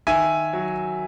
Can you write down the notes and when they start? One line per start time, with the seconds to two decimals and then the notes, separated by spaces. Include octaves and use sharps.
0.07 D#3 E5 G#5
0.53 F#3